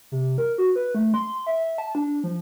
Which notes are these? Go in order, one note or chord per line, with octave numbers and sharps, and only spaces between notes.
C3
A#4
F#4
B4
A3
C6
E5
A5
D4
F3